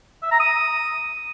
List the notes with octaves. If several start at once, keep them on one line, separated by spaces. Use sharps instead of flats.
E5
A#5
D#6